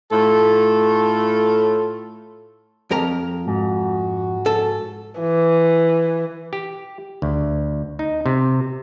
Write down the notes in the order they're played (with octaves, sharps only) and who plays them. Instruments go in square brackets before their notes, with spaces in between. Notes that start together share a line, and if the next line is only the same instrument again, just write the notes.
[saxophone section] A2 A3 F4 A4
[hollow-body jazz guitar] F2 A#4 A#5
[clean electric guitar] G#2 [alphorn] F#4
[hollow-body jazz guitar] A4
[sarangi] E3
[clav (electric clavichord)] G4
D2
D#4
C3